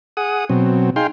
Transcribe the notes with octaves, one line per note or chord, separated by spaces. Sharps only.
G#4 F#5 D#6
B2 F#3 C4
D#4 G#4 F5 G5 C6